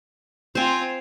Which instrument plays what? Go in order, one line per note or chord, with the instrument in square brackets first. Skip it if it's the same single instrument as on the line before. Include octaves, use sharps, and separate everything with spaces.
[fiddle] C4 F4 [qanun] C5 G#5